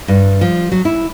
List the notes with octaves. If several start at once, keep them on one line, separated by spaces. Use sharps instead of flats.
G2
F3
F#3
E4